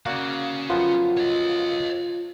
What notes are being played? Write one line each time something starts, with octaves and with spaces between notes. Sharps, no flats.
A#3 C#4 F#4 D5 F5
F#2 F3 B3 F4
C#5 D#5